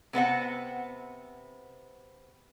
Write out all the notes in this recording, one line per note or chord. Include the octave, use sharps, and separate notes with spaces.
C3 B3 C4 F#5